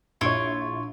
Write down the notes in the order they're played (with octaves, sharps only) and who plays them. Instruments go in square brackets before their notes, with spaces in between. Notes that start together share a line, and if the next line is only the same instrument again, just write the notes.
[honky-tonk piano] A#1 C#5 [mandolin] E4 F4 C#6